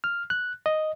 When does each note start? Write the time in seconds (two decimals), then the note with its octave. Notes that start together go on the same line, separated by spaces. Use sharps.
0.04 F6
0.30 F#6
0.66 D#5